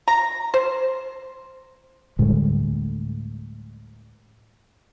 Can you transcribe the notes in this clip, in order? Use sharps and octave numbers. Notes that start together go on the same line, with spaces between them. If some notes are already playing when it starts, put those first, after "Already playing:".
A#5
C5
D2 A2 G3 G#3